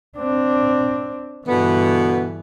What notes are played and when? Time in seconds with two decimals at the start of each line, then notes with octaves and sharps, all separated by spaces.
0.18 C4 D4
1.47 G2 B2 D3 E3 B3